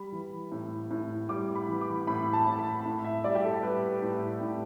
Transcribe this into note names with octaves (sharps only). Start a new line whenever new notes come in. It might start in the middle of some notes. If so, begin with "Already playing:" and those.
Already playing: G3 B5
E3
A2
A2
G3 D6
B5
E3
D6
A2 B5
A5
A2
B5
A2
E5
G3 D5
G4
A4
G3 B4
A2
A2